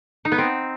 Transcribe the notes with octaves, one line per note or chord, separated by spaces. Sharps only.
D#4
B3
C4